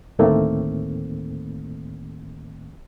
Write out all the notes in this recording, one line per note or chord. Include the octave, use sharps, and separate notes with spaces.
D2 A2 D#3 A3 A#3 C4